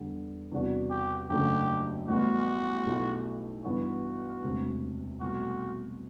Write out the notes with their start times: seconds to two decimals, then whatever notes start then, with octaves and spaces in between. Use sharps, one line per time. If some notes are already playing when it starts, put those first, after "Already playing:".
Already playing: E2 D3 G3
0.52 E2 C3 G3 D4 F#4
0.90 G4
1.29 F#1 F#2 D3 A3 G4
2.08 A1 A2 E3 G3 B3 F#4
2.86 B1 B2 A3 E4 G4
3.64 G2 E3 B3 F#4
4.43 E1 D2 C3
5.21 C2 B2 A3 F#4